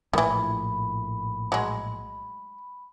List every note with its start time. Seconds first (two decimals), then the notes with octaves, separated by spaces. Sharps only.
0.13 A#1 A2 D#3 E3 B5
1.52 F#3 G#3